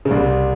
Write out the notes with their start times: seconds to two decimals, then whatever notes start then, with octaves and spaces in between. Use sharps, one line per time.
0.05 C#3
0.11 C2 C3